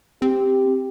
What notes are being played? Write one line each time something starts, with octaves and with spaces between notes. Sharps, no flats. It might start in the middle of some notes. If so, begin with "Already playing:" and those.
C4 G4